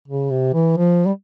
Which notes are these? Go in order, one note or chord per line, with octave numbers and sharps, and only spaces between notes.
C#3
C3
E3
F3
G3